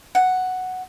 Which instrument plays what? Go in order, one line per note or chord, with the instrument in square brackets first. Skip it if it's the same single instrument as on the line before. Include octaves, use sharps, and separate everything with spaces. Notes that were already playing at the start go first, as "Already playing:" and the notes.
[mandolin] F#5